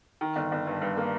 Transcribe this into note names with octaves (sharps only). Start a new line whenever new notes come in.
D#3
G1
G1
G2
G2
A#3